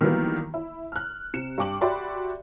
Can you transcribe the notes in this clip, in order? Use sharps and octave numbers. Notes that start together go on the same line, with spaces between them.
D#3 E3 F#3 G3 A#3 B3
E4
F6 F#6
C3 C#7 E7
G2 G5 D6 F#7
F#4 G4 D5 E5 B5 C6